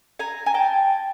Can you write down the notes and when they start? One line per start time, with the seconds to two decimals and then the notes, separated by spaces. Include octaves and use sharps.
0.19 G#5 A#5
0.46 G#5
0.54 G5 A5